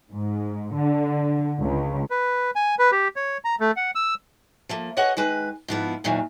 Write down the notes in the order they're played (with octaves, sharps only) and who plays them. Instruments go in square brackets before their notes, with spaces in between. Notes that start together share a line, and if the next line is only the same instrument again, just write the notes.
[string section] G#2
D3
C#2
[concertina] B4
G#5
B4
G4
C#5
A#5
A3
F#5
E6
[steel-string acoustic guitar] F3 A3 A#3
F#4 G#4 B4 C#5 D#5 F#5
D#3 G#3 B4
G#2 F3 B3 E4
E2 A#2 D#3 E3 F#3